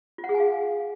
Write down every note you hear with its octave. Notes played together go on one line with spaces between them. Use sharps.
F4
F#5
G#4
G#5
F5